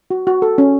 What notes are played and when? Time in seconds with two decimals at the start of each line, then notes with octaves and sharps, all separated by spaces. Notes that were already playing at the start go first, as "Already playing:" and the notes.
0.10 F#4
0.27 F#4
0.42 A4
0.58 C#4